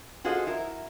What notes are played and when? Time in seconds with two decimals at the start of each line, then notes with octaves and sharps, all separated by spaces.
0.24 F4 F#4 G#4 A4 C5 D#5
0.47 E4 A#4